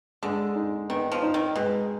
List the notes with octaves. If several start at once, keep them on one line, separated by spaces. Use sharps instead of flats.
D3 G#3
D#4
D#3 B3
F3
D#4
D#3
B2 G#3